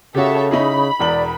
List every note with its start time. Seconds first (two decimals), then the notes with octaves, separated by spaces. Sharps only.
0.15 C#3 F#4 G4 A4 C#5 E5
0.51 D#4 E4 G#4 B5
0.99 E1 E2 D5 F#7